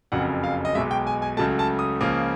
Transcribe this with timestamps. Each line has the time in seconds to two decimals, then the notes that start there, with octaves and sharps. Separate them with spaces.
0.12 F#1 F2 C#3 F#3 F#5
0.44 F5
0.65 D#5
0.75 B1 B2 G#3 E5
0.91 G5
1.07 G#5
1.22 G#5
1.37 C#2 C#3 F#3 A3 A5
1.59 A5
1.79 D#6
2.01 C#2 C#3 F3 A#3 D#6